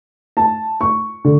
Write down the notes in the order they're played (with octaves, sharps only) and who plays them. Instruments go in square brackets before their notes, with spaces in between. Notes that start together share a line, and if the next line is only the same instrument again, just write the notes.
[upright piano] A5
C#6
D3